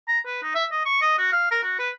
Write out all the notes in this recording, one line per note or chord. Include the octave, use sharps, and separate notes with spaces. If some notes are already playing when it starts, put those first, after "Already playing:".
A#5
B4
D#4
E5
D#5
C#6
D#5
F#4
F5
A#4
F#4
B4